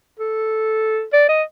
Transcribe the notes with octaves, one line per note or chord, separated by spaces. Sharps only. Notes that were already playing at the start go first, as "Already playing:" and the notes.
A4
D5
D#5